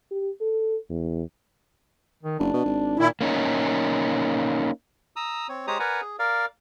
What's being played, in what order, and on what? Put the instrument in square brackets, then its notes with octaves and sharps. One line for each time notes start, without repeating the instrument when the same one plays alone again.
[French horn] G4
A4
E2
[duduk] D#3
[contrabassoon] F#1 [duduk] D4
[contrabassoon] B2
G#1
[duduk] A#2 [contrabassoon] D#3 [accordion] E4
[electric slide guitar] A#3 C#4 D#4
[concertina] A#5 D#6 E6
C4 C#5
G#3 G4 C5 C#5 A#5 D#6
A#4 B4 D5 F#5 G#5 A#5
G#4
A#4 D5 F5